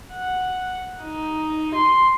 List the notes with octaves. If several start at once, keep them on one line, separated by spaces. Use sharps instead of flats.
F#5
D#4
C6